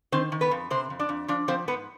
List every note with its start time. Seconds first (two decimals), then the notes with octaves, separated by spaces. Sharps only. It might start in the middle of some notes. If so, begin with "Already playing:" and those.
0.12 D#3 C4 C5
0.32 D#3
0.41 B3 B4
0.51 F2
0.70 C3 C4 C5
0.90 F2
0.99 D4 D5
1.09 F2
1.28 F3 D4 D5
1.48 F3 C4 C5
1.67 G#2 B3 B4